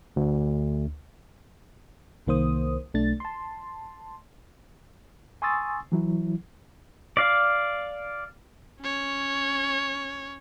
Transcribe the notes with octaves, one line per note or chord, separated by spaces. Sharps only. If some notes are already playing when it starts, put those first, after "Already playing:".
D2
C2 D#3 A#3 C5 D#6
B1 A3 D4 A6
A5 C6
G#5 C6 C#6 D#6 E6 A6
E3 F#3 E4
D5 F5
C#4 C#5